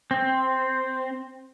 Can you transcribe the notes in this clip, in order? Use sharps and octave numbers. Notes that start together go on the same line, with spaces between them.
C4